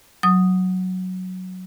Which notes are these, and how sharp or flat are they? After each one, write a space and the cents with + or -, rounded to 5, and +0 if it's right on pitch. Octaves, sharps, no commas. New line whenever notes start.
F#3 +0 D#6 +0